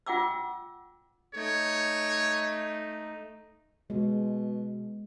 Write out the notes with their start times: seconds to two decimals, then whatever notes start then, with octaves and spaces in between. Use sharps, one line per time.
0.06 F4 F#5 G5 D6 E6
1.34 A3 D#4 C#5
3.90 B2 G#3